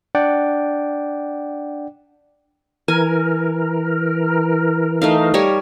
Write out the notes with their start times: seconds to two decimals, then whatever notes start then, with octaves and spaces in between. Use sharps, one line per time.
0.15 D4 D5 F#5 G5
2.88 E3 A#4 G#5
5.02 A3 D#4 F5
5.34 G3 A#4 C#5